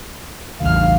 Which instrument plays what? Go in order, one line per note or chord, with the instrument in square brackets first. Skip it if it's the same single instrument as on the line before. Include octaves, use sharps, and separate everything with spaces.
[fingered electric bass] A1 E2 [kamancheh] F5 F6